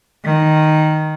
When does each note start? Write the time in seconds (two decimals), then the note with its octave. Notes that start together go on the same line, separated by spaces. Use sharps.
0.24 D#3